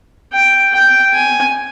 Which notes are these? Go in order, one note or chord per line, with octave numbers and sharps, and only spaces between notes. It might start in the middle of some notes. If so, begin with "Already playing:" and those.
G5
G5
G#5